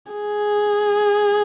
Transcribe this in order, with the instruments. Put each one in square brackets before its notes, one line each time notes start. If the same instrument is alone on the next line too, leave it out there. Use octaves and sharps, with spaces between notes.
[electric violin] G#4